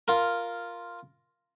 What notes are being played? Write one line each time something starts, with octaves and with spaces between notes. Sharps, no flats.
F4 A#4